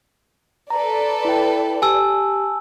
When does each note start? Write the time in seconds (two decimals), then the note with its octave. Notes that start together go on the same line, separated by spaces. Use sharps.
0.70 A4 B4 D5 A#5
1.25 E4 G5
1.82 G4 G#5 A5 E6